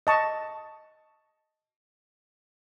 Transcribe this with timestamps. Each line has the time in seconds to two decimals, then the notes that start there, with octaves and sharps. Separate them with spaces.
0.07 D#5 A5 C#6